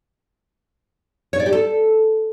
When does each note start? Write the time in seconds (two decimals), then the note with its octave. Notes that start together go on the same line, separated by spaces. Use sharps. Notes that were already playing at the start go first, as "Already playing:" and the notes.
1.33 C#5
1.39 D5
1.46 G4
1.52 A4